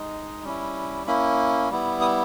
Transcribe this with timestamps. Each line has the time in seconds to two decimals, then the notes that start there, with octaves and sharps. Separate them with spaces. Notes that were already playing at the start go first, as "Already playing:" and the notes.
Already playing: G#3 D#4
0.44 G3 C#4 E4
1.07 A#3 C#4 E4 B5
1.70 G3 B3 E4
2.01 D#6